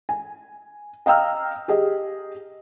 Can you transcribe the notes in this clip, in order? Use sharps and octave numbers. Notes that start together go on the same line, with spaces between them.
G#5
D#5 F5 G5 A#5 E6 F6
G4 G#4 D#5